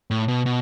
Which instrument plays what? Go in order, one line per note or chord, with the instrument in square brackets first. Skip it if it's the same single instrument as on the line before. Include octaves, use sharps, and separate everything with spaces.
[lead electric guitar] A2
B2
B2